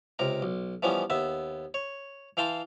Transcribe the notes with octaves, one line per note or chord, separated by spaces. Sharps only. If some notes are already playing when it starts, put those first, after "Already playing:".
C#2 C3 A#4
B1
E3 F3 G3 B3 C#4
D#2 B3 E5
C#5
E3 F5 G5 A5 C6